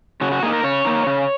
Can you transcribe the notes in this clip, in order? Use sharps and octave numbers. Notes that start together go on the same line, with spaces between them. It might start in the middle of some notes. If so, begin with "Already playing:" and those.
C#3 F#4
F#4
A#3 D#4 G#4
A#4
C#3 C#5
A#3 D#4
C#3